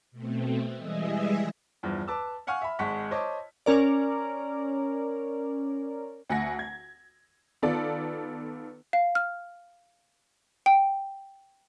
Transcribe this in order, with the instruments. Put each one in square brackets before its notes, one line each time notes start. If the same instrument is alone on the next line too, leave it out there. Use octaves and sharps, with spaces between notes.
[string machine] B2 A3 C4
E3 G3 G#3 G#4 D#5 E5
[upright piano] E2 G2 F3
B4 A5 D6 E6
F5 F#5 G#5 C#6 F6
E5 B5
G#1 G#3 F#5 A5 C#6 B6
C5 C#5 D#5 A5 D6
[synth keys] C#4 A#4 D5
[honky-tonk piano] D2 F#5 G#5 A#6
G#6
D#3 B3 F4 A4 D5
[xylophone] F5
F6
G5